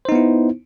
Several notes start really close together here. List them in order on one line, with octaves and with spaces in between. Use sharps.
C5 D#4 B3 E4